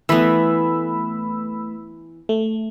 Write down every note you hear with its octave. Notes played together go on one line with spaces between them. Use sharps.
E3 A3 B3 B5 E6
A3